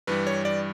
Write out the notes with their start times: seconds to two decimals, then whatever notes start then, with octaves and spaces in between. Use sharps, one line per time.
0.07 G2 E3 G3 B4
0.27 C#5
0.45 D5